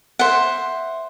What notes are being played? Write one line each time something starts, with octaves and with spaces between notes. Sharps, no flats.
C5 E5 F#5